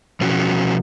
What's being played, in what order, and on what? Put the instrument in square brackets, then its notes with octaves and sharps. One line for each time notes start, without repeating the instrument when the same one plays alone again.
[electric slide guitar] B2 F3 C#4 F#4